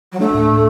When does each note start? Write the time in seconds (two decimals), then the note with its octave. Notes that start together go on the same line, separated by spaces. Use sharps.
0.12 F#3
0.20 A3 D4
0.34 A2
0.49 A2